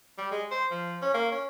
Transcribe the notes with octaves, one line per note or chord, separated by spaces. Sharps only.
G3
G#3
C5
F3
C#4
A#3
C#4